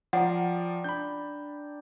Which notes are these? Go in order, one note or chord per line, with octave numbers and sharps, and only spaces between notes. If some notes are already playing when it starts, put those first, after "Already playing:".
F3 D5 F#5 G5 A#5
D4 B5 G6